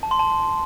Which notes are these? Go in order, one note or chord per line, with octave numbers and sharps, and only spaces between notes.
A5
C6
A5